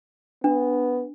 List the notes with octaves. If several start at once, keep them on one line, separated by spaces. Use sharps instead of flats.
B3 D4